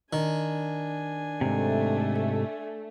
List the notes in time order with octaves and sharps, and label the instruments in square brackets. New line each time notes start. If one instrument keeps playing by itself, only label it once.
[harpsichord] D#3 [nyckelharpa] D4 G#5
[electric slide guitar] G#2 C3 [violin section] A3